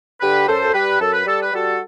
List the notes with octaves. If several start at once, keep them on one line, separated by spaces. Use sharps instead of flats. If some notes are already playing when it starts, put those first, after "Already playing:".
D3 G4 B4
F#2 A4 C5
G3 G4 B4
F#2 A4
B4
G3 A4
B4
G3 F#4 A4